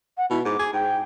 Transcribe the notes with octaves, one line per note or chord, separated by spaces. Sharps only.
F#5
B2 E4
G#2 D6
G#4
G#2 G5